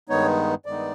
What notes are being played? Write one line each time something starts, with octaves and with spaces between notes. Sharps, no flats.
G2 D#3 G#3 B3 D#4 C#5
G2 D#3 G#3 B3 D#4 D5